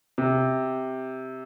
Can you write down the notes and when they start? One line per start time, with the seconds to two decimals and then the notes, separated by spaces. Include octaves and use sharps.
0.18 C3